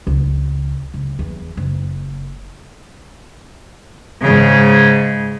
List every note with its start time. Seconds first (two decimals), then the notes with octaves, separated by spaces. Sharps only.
0.07 C#2
0.94 C#2
1.19 E2
1.57 F#1
4.21 G#2 C#3